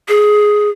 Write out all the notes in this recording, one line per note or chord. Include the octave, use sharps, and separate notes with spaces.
G#4